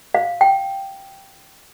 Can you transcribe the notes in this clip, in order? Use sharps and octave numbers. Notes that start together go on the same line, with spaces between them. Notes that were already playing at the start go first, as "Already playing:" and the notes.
F5
G5